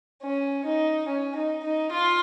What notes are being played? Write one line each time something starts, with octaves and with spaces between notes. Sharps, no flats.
C#4
D#4
C#4
D#4
D#4
F4